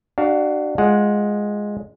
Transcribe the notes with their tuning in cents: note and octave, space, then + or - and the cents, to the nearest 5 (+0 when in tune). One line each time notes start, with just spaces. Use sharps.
D4 +20 F#4 +30 F5 +5
G#3 +0 F4 +0 F#5 -15